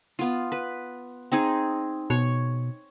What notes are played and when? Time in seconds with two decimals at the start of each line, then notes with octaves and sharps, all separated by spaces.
0.19 B3 F4
0.52 B4
1.32 C4 D#4 G#4
2.10 B2 C#5